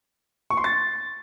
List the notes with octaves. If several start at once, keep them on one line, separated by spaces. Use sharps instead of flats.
C#6
C6
A6